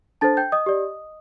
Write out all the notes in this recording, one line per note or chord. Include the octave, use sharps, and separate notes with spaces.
D4 A4 C5 A5 A6
G5 G6
D#5 D#6
G4 D5